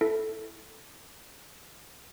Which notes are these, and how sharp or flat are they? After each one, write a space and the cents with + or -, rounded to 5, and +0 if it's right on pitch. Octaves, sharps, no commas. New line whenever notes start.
E4 +0 A4 +0